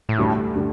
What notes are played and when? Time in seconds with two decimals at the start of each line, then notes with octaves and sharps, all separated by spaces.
0.09 A2
0.18 D2 D3 G3 D4
0.55 D3 G3 D4